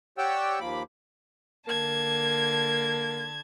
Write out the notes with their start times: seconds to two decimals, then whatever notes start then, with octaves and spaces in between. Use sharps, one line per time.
0.18 G4 C#5 D5 F#5 G5 E6
0.60 D#2 F3 A#3 B5 D6
1.68 D3 A#3 A5 G#6